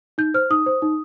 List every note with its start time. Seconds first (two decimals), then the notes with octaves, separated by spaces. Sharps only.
0.18 D#4 G6
0.34 C5 F6
0.50 D#4 D#6
0.66 C5
0.82 D#4